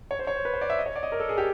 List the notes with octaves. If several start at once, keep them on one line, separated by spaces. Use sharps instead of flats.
C#5
C5
C#5
C5
B4
C5
D5
E5
D#5
C#5
D5
D#5
A#4
A4
G#4
G4